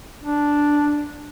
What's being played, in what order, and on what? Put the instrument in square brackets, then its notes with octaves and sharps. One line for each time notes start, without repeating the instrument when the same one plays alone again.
[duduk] D4